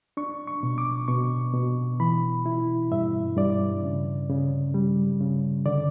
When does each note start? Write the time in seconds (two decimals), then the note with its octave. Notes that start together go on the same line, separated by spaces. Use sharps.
0.17 D4 C#6
0.47 C#6
0.63 B2
0.78 D6
1.08 B2 C#6
1.54 B2
2.00 E3 B5
2.46 E4
2.92 G2 E5
3.37 G2 D5
3.83 C#3
4.29 C#3
4.74 G3
5.20 C#3
5.66 D3 D5